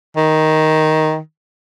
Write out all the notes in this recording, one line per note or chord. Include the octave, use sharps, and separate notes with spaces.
D#3